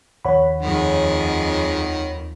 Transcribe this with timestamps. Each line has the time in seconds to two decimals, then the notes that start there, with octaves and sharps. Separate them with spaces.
0.25 D#2 F3 C#5 F#5 B5
0.62 F2 D#3 G#3